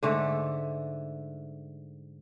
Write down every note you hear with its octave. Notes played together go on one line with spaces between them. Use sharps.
G#2 D3 A3